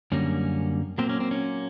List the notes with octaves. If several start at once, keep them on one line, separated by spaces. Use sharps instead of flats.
F#2 D3 G3 A#3 C#4
A#2 F#3 A#3 C4
C#4
C4
C#4